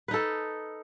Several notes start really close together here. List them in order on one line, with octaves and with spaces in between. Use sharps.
B4 D#4 A4